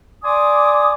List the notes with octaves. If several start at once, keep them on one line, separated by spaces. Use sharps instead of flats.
D5 G#5 C6 D6 D#6